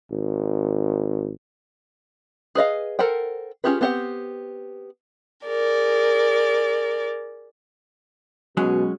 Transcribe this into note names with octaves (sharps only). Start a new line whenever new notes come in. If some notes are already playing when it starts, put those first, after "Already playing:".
G#1
G#4 B4 D#5 F5
A4 A#4 C5 F#5 G5
C#4 F4 G4 G#4 B4
B3 C4 G4 F5 F#5
G#4 A#4 D5
B2 F#3 G#3 C#4